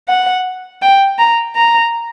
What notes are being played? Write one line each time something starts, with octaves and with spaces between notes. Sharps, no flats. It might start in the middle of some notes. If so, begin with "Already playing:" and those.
F#5
G5
A#5
A#5